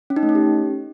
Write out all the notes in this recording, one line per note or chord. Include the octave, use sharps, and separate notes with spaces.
C#4
D#4
A3
C#4
G4